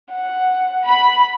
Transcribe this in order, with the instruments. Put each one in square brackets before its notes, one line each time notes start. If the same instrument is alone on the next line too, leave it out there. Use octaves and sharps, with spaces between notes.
[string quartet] F#5
[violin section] B5